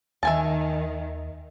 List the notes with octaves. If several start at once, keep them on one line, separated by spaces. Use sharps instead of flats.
D#2 D#3 E5 G#5 A5